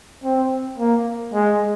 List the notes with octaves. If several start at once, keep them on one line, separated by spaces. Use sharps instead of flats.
C4
A#3
G#3